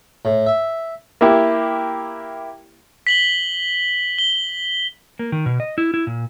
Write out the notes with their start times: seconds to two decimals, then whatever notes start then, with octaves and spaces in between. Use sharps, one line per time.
0.25 A2
0.46 E5
1.21 A#3 E4 G4
3.07 B6 F#7 G7
4.18 G7
5.19 A#3
5.32 D#3
5.46 B2
5.60 D#5
5.78 E4
5.94 E4
6.07 A#2